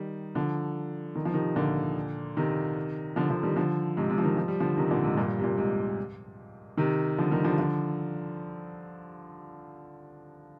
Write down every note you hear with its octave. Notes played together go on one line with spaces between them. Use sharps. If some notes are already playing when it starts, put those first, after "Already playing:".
Already playing: D#3 G3
D3 F3
D#3
F3
C3 D#3
A#2 D3
C3 D#3
D3 F3
D3 F3
D#3 G3
D3 F3
G#2 C3
G#2 C3
F3
C3 D#3
F3
G3
D3 F3
C3 D#3
A#2 D3
G#2 C3
G2 A#2
C3
G2 A#2
G#2 C3
C3 D#3
D3 F3
D#3 G3
D3 F3
D3 F3